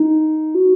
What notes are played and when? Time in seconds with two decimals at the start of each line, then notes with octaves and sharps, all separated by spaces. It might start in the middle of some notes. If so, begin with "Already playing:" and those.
Already playing: D#4
0.55 F#4